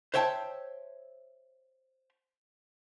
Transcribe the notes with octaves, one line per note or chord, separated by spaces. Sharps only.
C5 C#5 E5 G5 A5